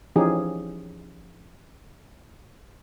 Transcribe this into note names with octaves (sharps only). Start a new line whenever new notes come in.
E3 F3 C#4 D#4 G4 G#4